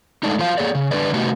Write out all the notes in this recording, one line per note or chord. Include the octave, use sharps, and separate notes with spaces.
G#3 A3 D4 D#4
F#3 F4 C5 F5
A#3 G#4 C#5 D5
C#3
D3 D4 A#4 B4 D5
C3 A3 B3 D#4 F#4 G4